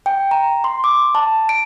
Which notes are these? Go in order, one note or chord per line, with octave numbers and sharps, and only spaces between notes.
G5
A#5
C6
D6
A5
D7